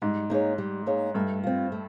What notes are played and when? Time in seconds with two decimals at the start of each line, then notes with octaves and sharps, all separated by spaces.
0.02 G#2 G3
0.30 A#3 D#4 G#4 C#5
0.58 G3
0.86 A#3 D#4 G#4 C#5
1.15 G2 A3
1.44 C4 F4
1.72 A3